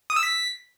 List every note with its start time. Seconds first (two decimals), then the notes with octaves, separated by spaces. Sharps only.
0.10 D#6
0.16 E6
0.23 B6